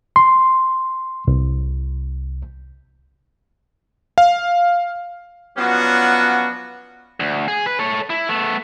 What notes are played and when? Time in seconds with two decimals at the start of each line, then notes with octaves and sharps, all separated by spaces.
0.16 C6
1.28 C2
4.18 F5
5.57 F3 F#3 B3 C#4 D4 F#4
7.20 D2
7.48 G#4
7.66 B4
7.79 A4 C#5
8.10 E4
8.29 A3 B3